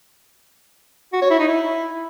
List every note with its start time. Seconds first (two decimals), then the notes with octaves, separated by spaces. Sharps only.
1.13 F#4
1.22 C#5
1.30 E4
1.39 D#4
1.48 E4